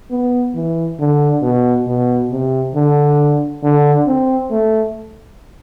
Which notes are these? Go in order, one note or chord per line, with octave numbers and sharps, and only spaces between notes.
B3
E3
D3
B2
B2
C3
D3
D3
C4
A3